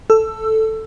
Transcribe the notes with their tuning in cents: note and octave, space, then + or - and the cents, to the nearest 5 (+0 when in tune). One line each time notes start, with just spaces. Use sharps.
A4 +0 E6 +20